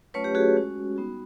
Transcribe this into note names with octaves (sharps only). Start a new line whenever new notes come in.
F#3 A3 C#4 F4 B4 C#5
G4
F#4 G#4
G#3 C#4 F#4
G3 B3 D#4 F#4